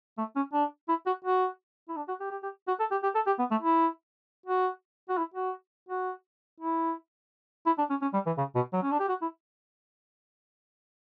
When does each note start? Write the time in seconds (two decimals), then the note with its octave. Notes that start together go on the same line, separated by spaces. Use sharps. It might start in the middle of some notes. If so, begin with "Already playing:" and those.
0.18 A3
0.36 C#4
0.53 D4
0.88 E4
1.06 F#4
1.25 F#4
1.89 E4
1.96 D4
2.08 F#4
2.20 G4
2.31 G4
2.43 G4
2.68 F#4
2.79 A4
2.91 G4
3.03 G4
3.15 A4
3.26 G4
3.39 B3
3.51 A3
3.62 E4
4.46 F#4
5.09 F#4
5.17 E4
5.34 F#4
5.89 F#4
6.60 E4
7.66 E4
7.78 D4
7.90 C#4
8.02 C#4
8.13 G3
8.26 E3
8.38 C#3
8.55 B2
8.73 F#3
8.83 C#4
8.91 D4
9.00 G4
9.09 F#4
9.22 E4